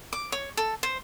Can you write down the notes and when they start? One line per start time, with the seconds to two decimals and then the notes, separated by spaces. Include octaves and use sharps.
0.13 D6
0.32 C#5
0.57 A4
0.83 C5